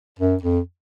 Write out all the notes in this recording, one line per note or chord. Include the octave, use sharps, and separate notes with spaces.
F#2
F2